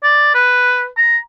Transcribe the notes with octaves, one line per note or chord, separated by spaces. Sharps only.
D5
B4
A#5